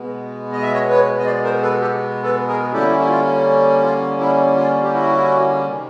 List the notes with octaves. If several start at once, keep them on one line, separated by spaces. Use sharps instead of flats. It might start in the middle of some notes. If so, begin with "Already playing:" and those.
Already playing: B2 G#3 B3
D#5
E5
C#5 D#5
B4 C#5
D#5
C5 D5
A#4 C5
A4 B4
G4 A4
A4 B4
G#4 A#4
D3 G3 A#3 C#4 E4 G4 A4
E4
F4
F4
E4
F4
G4
E4 F#4
C3 D#3